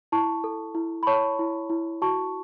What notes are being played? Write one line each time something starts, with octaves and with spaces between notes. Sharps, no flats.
E4 A5 C#6
A4
E4
B5
C#5 A5 C#6
E4
E4
F#4 A5 C#6